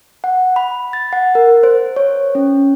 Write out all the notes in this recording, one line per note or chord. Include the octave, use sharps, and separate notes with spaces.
F#5
B5
A6
F#5
A#4
C5
C#5
C#4